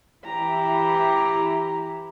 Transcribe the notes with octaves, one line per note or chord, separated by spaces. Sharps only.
E3 E4 G4 A#5